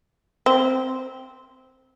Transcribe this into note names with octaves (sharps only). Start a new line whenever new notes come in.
C4